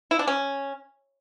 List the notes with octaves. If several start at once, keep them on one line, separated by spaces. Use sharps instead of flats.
E4
D4
C#4